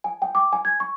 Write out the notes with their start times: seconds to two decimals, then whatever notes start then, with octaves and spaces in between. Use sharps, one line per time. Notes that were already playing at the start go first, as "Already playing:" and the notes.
0.04 G#5
0.22 G5
0.35 D6
0.53 G#5
0.65 G#6
0.80 C#6